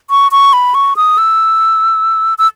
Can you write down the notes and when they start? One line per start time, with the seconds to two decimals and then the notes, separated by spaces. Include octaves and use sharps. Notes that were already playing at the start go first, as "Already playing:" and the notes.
0.10 C#6
0.32 C#6
0.53 B5
0.74 C#6
0.96 D#6
1.18 E6
2.38 E6